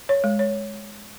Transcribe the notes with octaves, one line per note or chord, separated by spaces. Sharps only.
C#5
G#3
C#5